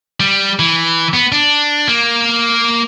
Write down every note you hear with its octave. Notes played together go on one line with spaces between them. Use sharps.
G3
E3
B3
D4
A#3